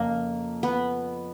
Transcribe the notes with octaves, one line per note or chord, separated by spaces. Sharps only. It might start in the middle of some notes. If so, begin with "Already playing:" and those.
Already playing: F2 C#3 A#3
B3